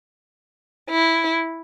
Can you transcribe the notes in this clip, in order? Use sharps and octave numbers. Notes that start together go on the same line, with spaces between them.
E4